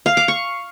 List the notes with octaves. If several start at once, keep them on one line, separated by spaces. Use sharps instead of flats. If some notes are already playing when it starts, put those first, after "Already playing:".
F5
D6
C#6